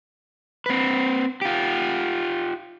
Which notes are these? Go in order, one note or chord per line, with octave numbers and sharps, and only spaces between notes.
C4 B4
F4 G4